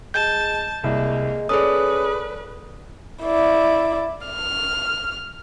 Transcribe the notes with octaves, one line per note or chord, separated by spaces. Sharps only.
G#3 A5 G6
C2 G#3 A#3
C#4 G#4 A4 B4 D5 D#6
E4 D5
F6